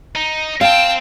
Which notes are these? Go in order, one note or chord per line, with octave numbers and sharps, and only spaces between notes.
D#4
C4 F5 G5 A5